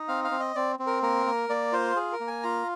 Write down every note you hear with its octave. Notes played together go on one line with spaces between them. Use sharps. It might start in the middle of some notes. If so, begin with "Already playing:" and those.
Already playing: D#4
C4 F5
F5
C4
D#5
C4 D5
C4
A#4
A#3 A#4
A#3
A#3 D5
F4 C5
G#4
A#4
A#3
G#5
F4 A#5